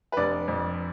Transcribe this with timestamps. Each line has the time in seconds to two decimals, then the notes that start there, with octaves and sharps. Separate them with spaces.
0.12 B4
0.17 F1 D4 D5
0.48 F2